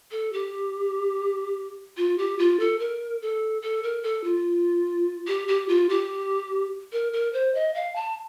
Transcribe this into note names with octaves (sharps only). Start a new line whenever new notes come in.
A4
G4
F4
G4
F4
A4
A#4
A4
A4
A#4
A4
F4
G4
G4
F4
G4
A#4
A#4
C5
D#5
F5
A5